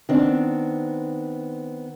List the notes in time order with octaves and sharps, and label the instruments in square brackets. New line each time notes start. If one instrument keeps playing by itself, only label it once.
[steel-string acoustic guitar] D#3 B3 C4 D4